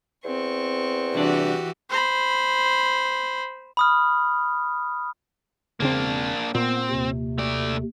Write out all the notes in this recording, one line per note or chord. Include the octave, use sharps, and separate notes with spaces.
E2 C4 C#6
C2 E3 D4 F#4 G4
C5 B5
B5 D#6 F6
E1 C#3 A#3 C4 D4
A#2 B3 C4
D#2 C3
A3 D5